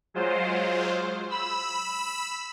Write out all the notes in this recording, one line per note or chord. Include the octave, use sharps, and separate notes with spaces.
F#3 G#3 F4 C5
B5 E6